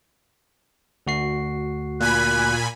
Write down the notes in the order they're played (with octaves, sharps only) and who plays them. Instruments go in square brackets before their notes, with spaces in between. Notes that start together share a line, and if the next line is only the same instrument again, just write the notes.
[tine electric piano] D2 F#4 C7
[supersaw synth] A#2 G#5 B5 [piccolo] F#6